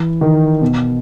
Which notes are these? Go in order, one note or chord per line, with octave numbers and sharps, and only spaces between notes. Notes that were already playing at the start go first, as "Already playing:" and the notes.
Already playing: E3
D#3
B2